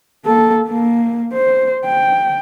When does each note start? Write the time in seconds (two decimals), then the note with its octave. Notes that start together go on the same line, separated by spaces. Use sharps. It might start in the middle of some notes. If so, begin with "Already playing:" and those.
0.25 A#3 A4
0.68 A#3
1.33 C5
1.85 G5